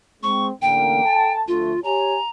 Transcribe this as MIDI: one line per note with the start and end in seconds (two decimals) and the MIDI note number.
0.23 0.50 56
0.23 0.50 60
0.23 0.47 85
0.62 1.01 33
0.62 1.01 50
0.62 1.01 58
0.62 1.33 79
1.04 1.41 69
1.04 1.41 80
1.04 1.41 81
1.48 1.73 38
1.48 1.73 53
1.48 1.73 57
1.48 1.80 65
1.84 2.18 67
1.84 2.18 73
1.84 2.18 80
1.84 2.29 82